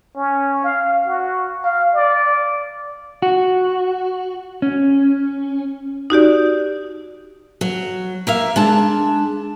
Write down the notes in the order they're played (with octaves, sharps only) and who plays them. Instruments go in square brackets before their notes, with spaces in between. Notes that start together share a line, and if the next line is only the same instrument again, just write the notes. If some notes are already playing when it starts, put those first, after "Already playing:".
[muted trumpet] C#4
F5
F#4
F5
D5
[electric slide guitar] F#4
C#4
[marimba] D#4 F#4 G4 D5
[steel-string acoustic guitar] F#3
A#3 E5 F5
G#3 D4 A5